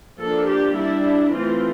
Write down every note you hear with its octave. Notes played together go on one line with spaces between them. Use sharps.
F3 A#3 D4 A4
G4
G3 D4 E4
E3 A3 C4 F4